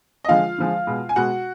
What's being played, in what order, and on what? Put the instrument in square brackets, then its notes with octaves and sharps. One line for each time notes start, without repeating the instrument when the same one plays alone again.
[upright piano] D#5
D3 F3 G#3 F4 F5
D3 F3 G#3
B2 G#3
G#5
B2 G#3 F#4 F#5